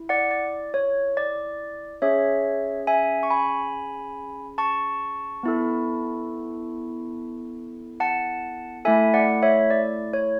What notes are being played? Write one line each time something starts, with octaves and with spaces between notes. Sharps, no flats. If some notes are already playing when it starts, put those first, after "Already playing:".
Already playing: E4
D5 F#5
D5
C#5
D5
C#4 G#4 C#5 E5
E5 G#5
C#6
G#5 B5
A5 C#6
B3 E4 A4
F#5 A5
A3 E4 A4 E5 G#5
D5 F#5
C#5 E5
D5
C#5